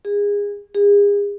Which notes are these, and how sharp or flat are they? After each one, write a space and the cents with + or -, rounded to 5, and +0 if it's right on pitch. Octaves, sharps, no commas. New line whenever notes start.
G#4 -25
G#4 -35